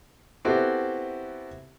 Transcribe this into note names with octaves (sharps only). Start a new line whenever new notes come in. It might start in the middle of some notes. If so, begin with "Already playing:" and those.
B3 C4 E4 F#4 G4 A4